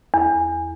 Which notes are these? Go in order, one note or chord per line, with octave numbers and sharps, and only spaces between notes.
E2